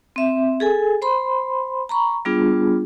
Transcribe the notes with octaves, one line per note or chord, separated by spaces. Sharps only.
C4 E5
G#4 A4 G#5
C5 B5 C6
A#5 B5 C#6
G3 B3 D4 F4 G#4